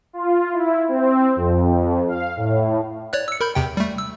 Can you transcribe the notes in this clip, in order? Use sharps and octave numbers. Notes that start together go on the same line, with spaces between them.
F4
E4
C4
F2
F5
A2
C#5 D5 F#6
E6 C#7
A#4 B5 G6
E2 C3 G5
G3 A3
E6